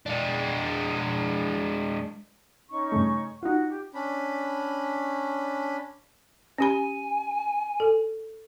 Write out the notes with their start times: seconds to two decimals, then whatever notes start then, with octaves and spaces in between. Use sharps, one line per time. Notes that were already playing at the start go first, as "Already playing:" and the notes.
0.06 G#3 D4
2.70 C#4 D#4 C#6
2.92 G2 C#3 A3
3.43 D#4 F4 F#4 F#5 F#6
3.69 G4
3.94 C#4 D4 B5
6.58 C#4 G4 G#5 B5
7.80 A4